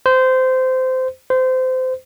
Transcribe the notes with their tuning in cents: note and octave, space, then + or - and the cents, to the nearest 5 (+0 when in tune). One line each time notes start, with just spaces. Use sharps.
C5 -20
C5 -25